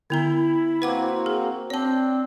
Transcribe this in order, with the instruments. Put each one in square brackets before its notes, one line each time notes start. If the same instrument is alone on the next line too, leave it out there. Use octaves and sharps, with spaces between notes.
[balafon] D3 B3 A#5 [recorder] E4
[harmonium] A#3 C4 F#4 [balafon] B4 F#5 D6
[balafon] G#4
[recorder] C4 [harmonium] D4 [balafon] C#5 A5